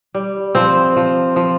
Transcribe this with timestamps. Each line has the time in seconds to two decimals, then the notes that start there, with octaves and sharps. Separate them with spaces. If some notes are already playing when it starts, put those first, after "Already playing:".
0.14 G3
0.55 F3 C4
0.97 F3
1.36 F3